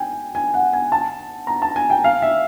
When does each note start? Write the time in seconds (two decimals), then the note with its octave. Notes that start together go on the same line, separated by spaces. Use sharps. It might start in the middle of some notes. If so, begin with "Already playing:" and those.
Already playing: G5 G#5
0.35 G#5
0.54 F#5
0.73 G#5
0.92 A5
1.47 A#5
1.62 A5
1.76 G#5
1.90 G5
2.04 F5
2.22 E5